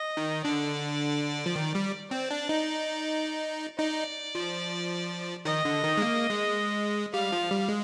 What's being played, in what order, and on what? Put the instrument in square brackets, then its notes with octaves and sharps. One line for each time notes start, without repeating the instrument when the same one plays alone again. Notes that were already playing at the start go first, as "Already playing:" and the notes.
Already playing: [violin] D#5
[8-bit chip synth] D#3
[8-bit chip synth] D3 [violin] D5
[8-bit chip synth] F3
D#3
G3
[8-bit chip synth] C4 [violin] D5
[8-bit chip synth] D4
D#4
[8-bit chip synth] D#4 [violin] D5
[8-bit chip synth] F3
[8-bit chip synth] D#3 [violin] D#5
[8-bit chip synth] D3
D#3
G#3
A#3
G#3
[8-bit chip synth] G3 [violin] F5
[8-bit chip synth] F3
G3
G#3